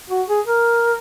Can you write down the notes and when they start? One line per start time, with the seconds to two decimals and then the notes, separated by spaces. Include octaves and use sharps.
0.10 F#4
0.28 G#4
0.47 A#4